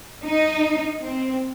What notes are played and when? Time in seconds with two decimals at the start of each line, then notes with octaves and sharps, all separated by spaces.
0.24 D#4
1.03 C4